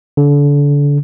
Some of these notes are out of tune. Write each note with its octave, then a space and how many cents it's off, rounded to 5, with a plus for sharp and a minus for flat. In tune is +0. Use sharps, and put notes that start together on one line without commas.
D3 -30